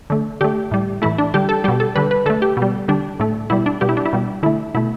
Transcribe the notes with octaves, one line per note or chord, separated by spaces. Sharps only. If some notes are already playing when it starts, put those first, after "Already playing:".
D3 A3
D3 A3 G4
A2 G3
A2 E3 A3 E4
D4
D3 G3 G4
A4
B2 G3 G4
A4
D3 G3 B4
B4
D3 A3 A4
G4
B2
G3
D3 G3 D4
A2 A3
B2 G3 E4
D4
B2 G3 G4
E4
D4
E4
B2 G3
D3 A3 E4
B2 A3 E4